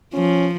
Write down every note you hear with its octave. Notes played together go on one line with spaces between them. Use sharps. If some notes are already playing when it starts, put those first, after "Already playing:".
F3 C#4